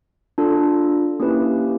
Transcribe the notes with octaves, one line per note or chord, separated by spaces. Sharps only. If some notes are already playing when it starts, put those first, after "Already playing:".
D4 F4 A4
A#3 C#4 E4 G4 B4